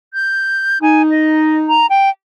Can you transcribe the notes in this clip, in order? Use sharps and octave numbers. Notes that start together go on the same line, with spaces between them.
G6
D#4 G#5
D#5
A#5
G5